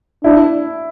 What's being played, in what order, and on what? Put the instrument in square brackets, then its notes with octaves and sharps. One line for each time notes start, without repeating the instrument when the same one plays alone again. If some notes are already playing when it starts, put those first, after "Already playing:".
[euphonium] D4 [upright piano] E4